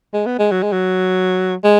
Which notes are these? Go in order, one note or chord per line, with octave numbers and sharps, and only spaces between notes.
G#3
B3
G#3
F#3
G#3
F#3
G#3